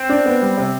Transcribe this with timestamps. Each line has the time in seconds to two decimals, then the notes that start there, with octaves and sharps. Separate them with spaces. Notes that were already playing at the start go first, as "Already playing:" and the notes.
Already playing: C4
0.09 D4
0.26 B3
0.42 G3
0.58 C3